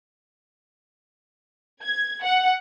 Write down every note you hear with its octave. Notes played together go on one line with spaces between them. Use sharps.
G#6
F#5